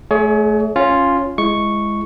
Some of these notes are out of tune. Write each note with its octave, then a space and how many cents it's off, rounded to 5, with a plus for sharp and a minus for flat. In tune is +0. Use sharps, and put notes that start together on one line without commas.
A3 -20 G#4 +30 C#5 +30
C#4 +0 F4 +0
G#3 +0 E4 +15 C#6 +0